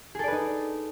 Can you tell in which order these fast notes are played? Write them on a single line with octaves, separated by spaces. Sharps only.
G#4 A4 D5 B4 D#4